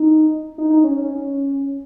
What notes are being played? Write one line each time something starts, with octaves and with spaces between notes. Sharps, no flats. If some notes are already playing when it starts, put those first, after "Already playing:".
Already playing: D#4
D#4
D#4
C#4
C#4